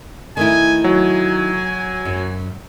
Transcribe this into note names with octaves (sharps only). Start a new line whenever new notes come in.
D#3 A3 E4 G#5
F#3 G#5
F#2